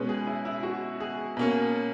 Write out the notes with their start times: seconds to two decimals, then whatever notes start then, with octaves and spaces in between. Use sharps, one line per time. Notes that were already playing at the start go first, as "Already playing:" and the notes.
Already playing: B2 G#3 C#4 B4
0.09 G#4
0.27 E4
0.45 E4
0.63 F#4
1.00 G#4
1.37 B2 A#3 C#4